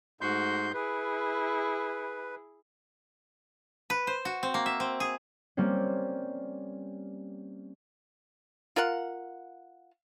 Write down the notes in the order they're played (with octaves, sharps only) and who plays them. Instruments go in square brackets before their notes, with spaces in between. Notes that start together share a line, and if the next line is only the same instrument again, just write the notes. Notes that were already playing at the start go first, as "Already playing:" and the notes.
[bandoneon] G#2 C6 G6 [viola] A3 F#4
[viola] E4 G#4 [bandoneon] B4
[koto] B4
C5
F#4
C4
A#3
E5
C4
G#4
[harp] G3 A#3 C4 C#4
[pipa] F4 A#4 F5 F#5